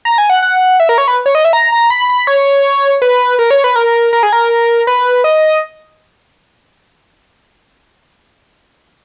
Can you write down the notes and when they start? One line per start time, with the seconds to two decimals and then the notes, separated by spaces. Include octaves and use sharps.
0.05 A#5
0.18 G#5
0.30 F#5
0.43 F#5
0.80 E5
0.89 A#4
0.98 C#5
1.08 B4
1.26 C#5
1.35 D#5
1.45 E5
1.53 A#5
1.72 A#5
1.90 B5
2.09 B5
2.27 C#5
3.02 B4
3.39 A#4
3.51 C#5
3.64 B4
3.76 A#4
4.13 A#4
4.23 G#4
4.33 A#4
4.87 B4
5.24 D#5